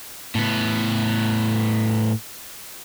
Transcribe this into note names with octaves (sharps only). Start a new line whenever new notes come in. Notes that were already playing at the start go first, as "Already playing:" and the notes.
A2 B3